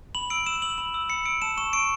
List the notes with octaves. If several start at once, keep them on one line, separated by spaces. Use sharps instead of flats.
B5 F#7
E6 D7
E6 E7
E6 F#7
B5 E7
E6
B5 C#7
E6 D7
A5 E7
C#6 E7
C#6 D7